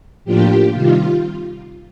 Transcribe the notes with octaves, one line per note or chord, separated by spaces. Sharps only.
A2 F3 A#3 D4 F4 G4
C3 D#3 G3 F4